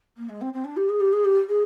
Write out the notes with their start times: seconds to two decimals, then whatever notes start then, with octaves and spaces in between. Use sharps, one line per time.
0.17 A#3
0.29 G#3
0.41 C4
0.53 C4
0.64 D4
0.76 G4
0.89 G#4
1.00 G4
1.12 G#4
1.24 G4
1.48 G#4